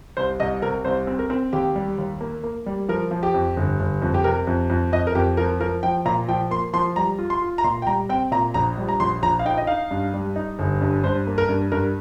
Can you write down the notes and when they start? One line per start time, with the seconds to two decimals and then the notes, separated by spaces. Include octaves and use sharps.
0.17 C2 C5
0.40 C2 D#5
0.62 C3 A#4
0.85 C2 C5
1.07 C4
1.19 A#4
1.30 C4
1.53 D#2 G4
1.75 G3
1.98 D#2
2.21 A#3
2.44 A#3
2.66 G3
2.89 F3 A#4
3.11 F3
3.23 G4
3.34 F2
3.57 G1
3.80 G1
4.02 F2
4.14 G4
4.24 C3 A#4
4.47 F2
4.70 F2
4.92 F2 D#5
5.07 A#4
5.15 F2 G4
5.37 F3 A#4
5.61 F3 A#4
5.83 F3 G5
6.05 A#2 A#5
6.29 F3 G5
6.51 A#3 C6
6.73 F3 C6
6.96 G3 A#5
7.19 F4
7.30 C6
7.42 F4
7.58 A#5
7.64 A#2 C6
7.82 G5
7.87 G3 A#5
8.09 C4 G5
8.31 A#2 A#5
8.54 A#1 A#5
8.78 G3
8.89 A#5
9.00 A#1 C6
9.22 A#1 A#5
9.39 F5
9.45 D#4 G5
9.58 D#5
9.67 D#4 F5
9.91 G2
10.14 G3
10.36 D#4
10.59 G1
10.81 G2
11.04 G2 C5
11.27 A#3
11.38 A#4
11.49 G2
11.72 G2 A#4